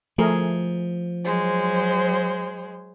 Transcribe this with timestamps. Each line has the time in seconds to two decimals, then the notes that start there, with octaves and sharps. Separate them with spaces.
0.18 F3 A3 G#4 A#4
1.25 F#3 G#3 C5